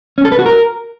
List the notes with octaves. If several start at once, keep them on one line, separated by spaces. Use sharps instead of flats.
C#4
A4
B4
F#4
A#4